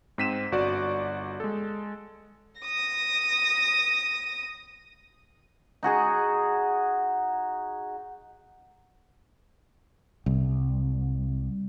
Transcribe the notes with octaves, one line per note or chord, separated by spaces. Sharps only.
G#2 C4 B6 D#7 E7
G1 F#4 D5
G#3 A4
D#6 A#6
D#4 F#4 G#4 D#5
C2